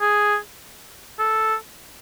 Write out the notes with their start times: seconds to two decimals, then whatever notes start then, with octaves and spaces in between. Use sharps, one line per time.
0.01 G#4
1.20 A4